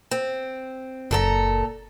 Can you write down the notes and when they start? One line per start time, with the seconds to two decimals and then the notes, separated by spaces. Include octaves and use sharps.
0.11 C4
1.11 F#1 A#2 A4 A#5